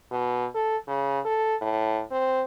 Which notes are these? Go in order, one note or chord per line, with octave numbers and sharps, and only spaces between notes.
B2
A4
C#3
A4
A2
C4